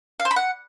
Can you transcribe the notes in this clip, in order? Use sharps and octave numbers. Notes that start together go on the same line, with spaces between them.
F5
C5
B5
F#5